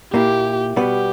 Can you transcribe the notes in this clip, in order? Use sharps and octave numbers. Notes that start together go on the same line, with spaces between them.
A#2 A#3 E4 G4
B2 G3 B3 G4